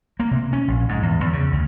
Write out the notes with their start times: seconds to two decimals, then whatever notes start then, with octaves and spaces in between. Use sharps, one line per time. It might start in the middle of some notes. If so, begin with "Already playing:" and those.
0.20 A#3
0.31 C3
0.53 C#4
0.68 A#1
0.89 G#2
1.02 E2
1.20 E2
1.33 C#3
1.52 D2